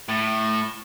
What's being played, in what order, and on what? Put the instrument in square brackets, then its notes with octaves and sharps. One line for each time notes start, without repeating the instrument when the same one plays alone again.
[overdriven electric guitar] A2